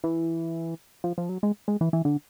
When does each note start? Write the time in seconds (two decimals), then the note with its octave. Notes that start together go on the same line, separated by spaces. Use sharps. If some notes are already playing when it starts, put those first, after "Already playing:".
0.04 E3
1.04 F3
1.18 F3
1.29 F#3
1.43 G#3
1.68 G#3
1.81 E3
1.93 E3
2.05 D3